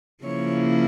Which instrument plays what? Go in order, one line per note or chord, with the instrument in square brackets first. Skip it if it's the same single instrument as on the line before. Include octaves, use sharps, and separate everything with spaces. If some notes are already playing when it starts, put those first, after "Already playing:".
[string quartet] C#3 F3 A#3 E4 C#5